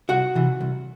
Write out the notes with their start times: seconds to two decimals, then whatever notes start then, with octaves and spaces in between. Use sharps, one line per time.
0.09 C2 F#4 F#5
0.35 C3 E3
0.61 C2